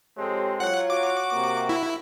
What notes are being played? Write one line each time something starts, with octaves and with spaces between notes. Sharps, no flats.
F2 G#3 C4 G4 A4 C#5
F#3 F4 C#5 F#5
F#4 D6
C3 A#3
E4